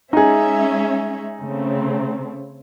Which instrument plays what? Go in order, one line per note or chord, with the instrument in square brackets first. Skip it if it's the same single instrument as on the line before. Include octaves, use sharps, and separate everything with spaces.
[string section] G#3 C#4 E5 [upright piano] D#4 G#4
[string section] C#3 A3 C4